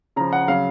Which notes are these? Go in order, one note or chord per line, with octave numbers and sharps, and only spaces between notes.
C#3 F3 A#5
F#5
C#3 F#3 F5